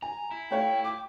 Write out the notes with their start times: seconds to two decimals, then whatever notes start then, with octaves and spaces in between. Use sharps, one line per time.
0.02 G#5 A#5
0.31 E4
0.51 A3 C#5 F5 G5
0.84 G5 D6